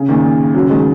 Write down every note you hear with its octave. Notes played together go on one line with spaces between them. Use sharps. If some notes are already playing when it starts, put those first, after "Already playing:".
Already playing: C#3
A#2 D#3
C#3 F#3
D#3 G#3